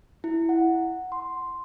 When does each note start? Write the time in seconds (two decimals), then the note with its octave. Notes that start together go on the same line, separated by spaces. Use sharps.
0.24 E4
0.49 F#5
1.12 C6